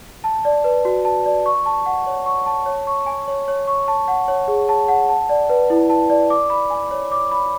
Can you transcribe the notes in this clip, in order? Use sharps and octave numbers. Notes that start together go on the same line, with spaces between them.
A5
D5
B4
F#4
A5
D5
C#6
A5
F#5
C#5
C#6
A5
C#5
C#6
G#5
C#5
C#5
C#6
A5
F#5
C#5
G#4
A5
F#5
A5
D5
B4
E4
A5
D5
D6
B5
G#5
C#5
D6
B5